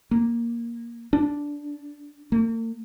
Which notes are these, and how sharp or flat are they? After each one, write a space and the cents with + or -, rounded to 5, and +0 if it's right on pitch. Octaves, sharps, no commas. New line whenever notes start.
A#3 +5
D4 -10
A#3 -45